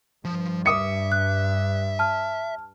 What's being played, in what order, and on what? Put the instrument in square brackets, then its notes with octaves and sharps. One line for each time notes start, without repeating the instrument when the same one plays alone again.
[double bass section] G2 [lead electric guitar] F3
[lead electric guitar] E5 [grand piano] D6 D#6 C#7
[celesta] F#6
A5 F6